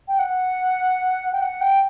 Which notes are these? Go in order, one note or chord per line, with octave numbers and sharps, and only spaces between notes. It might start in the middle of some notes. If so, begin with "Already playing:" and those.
G5
F#5
G5
F#5
G5